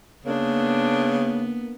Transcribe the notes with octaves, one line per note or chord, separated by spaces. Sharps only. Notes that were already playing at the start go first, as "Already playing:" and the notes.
C#3 A#3 B3 D4